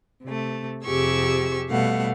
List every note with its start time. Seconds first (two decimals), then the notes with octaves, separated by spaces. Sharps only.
0.23 C3 A3
0.84 F2 C3 G4 G#4 C#6 E6
1.69 B2 G3 A3 F5 F#5